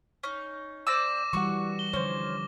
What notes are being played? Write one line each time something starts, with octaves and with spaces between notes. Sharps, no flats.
C#4 D#4
C4 D5 D6 E6 A#6 E7
E3 G3 F#4 F#5 C#6
G7
D3 F3 C#4 C5 C#5